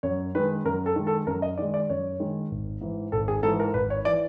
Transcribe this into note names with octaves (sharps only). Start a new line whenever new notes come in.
F#2 C#5
D#3 G#3 B4
F#2 A#4
A4
D#3 G#3
A4
F#2 A#4
D#5
D#3 G#3 D5
D5
F#2 C#5
D#3 G#3
G#1
G#2 E3
G#1 A4
G#4
G#2 E3 A4
A#4
G#1 B4
C#5
E3 D5